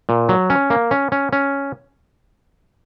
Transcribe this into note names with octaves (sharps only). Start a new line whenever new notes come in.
A#2
F#3
C#4
A#3
C#4
C#4
C#4